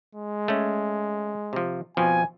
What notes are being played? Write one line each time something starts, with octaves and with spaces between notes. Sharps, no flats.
G#3
A3 C#4
C3 F3
F2 B2 F3 G#5